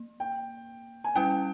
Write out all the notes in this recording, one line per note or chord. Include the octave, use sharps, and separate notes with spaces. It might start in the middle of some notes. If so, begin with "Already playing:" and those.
Already playing: A#3
G5
G#5
G3 C#4 E4 G5